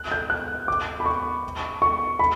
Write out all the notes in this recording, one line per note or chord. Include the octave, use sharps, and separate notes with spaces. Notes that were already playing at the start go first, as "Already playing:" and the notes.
Already playing: F#6
G6
F#6
D6
B5
C#6
C#6
B5